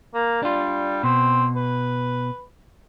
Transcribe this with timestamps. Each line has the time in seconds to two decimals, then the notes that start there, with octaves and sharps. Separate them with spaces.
0.14 A#3
0.43 G3 D4 F4
1.03 B2 C4
1.56 B4